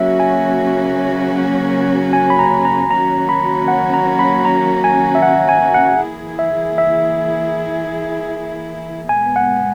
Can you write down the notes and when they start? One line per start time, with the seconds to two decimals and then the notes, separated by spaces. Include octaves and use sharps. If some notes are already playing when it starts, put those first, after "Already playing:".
Already playing: C#3 F#3 A#3 C#4 F#4 E5
0.20 G#5
2.13 G#5
2.30 B5
2.39 A#5
2.65 A#5
2.90 D#3 F#3 A#3 C#4 F#4 A#5
3.29 B5
3.68 F#5
3.94 A#5
4.19 B5
4.45 A#5
4.84 G#5
5.15 E5
5.22 F#5
5.49 G#5
5.74 F#5
6.00 E3 A#3 E4 G#4
6.39 E5
6.78 E5
9.09 A#2 G#3 B3 G#5
9.36 F#5